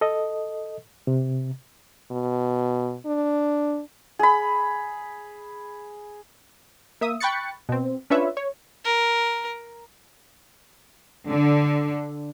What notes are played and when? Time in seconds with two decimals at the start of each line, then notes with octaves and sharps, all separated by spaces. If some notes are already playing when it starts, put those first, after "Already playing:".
0.01 A4 D#5
1.07 C3
2.11 B2
3.06 D4
4.19 G#4 B5
7.01 A#3 E5 D#6
7.20 G5 B5 C#6 F#6 A6 C#7
7.69 B2 C4
8.10 C#4 D4 F4 B4 C#5 E5
8.37 C#5
8.85 A#4
11.28 D3